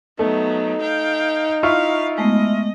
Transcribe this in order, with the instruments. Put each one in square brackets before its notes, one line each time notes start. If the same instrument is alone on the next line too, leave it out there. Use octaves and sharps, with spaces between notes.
[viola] F#3 B3 [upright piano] A3 [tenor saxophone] D#4
[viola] F5 G5
[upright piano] E4 F4 C#6 [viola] F5
[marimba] G#3 A3 B3 [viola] D#5